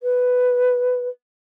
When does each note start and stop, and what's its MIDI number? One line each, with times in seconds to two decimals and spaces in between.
0.02 1.07 71